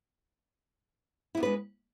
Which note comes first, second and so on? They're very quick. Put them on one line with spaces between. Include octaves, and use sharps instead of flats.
E4 B3 D4 B4 G#3